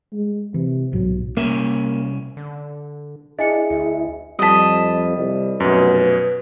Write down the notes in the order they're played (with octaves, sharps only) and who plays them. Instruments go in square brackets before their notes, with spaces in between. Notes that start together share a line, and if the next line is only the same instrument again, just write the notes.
[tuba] G#3
[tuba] C3 [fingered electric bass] E3
[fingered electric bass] B1 G#2 B2 [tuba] F#3
[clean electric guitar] C2 C#4 E5 [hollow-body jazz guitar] A#3
[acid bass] D3
[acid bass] D4 [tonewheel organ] E4 [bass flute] G#4 [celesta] D#5 G#5 C#7
[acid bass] D2
[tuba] F2 [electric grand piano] G3 B6 [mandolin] D#5 A5
[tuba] C2
[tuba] F1 [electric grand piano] F#2 B2 [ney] B4